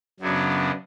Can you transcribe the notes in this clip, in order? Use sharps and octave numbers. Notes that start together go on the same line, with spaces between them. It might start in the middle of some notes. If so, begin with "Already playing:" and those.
F#2 C#3 F#3 B3 D4